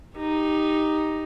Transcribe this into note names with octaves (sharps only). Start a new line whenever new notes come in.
D#4 G4